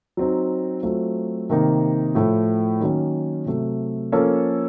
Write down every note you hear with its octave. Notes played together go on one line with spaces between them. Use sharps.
F#3 C4 D#4
F#3 A3 C4 F4
C3 D#3 A#3 D#4
A2 F3 A3
D#3 F#3 A#3 C#4
C3 F#3 A3
F3 A#3 C#4 A4